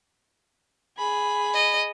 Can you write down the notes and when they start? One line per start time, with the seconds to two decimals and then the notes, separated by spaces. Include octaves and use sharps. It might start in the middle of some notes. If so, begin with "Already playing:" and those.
0.98 G#4 B5
1.54 D#5